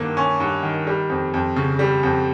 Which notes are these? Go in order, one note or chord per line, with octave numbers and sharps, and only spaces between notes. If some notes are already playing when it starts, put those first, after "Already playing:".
Already playing: G2 D#3 A#3
C#4
G2
D#3
G3
F2
F2
C#3
G3
F2